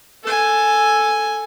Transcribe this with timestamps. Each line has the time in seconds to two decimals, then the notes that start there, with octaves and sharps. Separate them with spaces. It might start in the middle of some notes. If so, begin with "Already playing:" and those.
0.23 A4 G#5